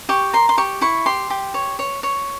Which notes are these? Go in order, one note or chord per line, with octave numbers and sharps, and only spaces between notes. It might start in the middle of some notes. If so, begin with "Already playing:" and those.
G4 C#6
A#4 C6
C6
G4 C#6
E4 C#6
G4 C6
G4
C#5
C#5
C#5